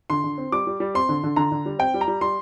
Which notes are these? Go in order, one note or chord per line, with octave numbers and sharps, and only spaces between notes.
D3 C6
D3
C4
G3 D6
G3
G3
C4 C6
D3
D3
D3 A#5
D3
G3
C4 G5
G3
A#5
G3
G3 C6